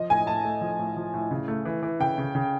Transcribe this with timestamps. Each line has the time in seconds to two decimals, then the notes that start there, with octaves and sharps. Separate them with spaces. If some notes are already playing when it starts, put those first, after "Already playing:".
Already playing: F3 D#5
0.09 A2 G#5
0.27 A2 A5
0.44 A3
0.61 F3
0.79 A2
0.96 F3
1.14 A2
1.31 C#3
1.48 A3
1.65 E3
1.83 E3
2.00 C#3 G5
2.18 C#3
2.35 C#3